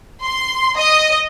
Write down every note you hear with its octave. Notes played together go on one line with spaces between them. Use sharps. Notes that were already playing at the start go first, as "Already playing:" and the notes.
C6
D#5